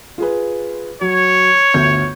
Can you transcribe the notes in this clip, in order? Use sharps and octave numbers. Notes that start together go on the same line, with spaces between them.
F4 G#4 B4
F#3 C#5
G1 D2 G6